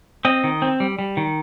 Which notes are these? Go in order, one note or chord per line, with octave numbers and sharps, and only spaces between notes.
C4 D#5
D#3
C4
G3
G3
D#3